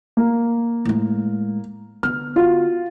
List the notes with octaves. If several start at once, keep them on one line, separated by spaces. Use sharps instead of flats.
A#3
A2 G#3
D3 B3 F6
F4 F#4